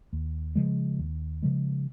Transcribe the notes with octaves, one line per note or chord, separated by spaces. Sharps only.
D#2
C#3 F3 G#3
D#2
C#3 F3 G#3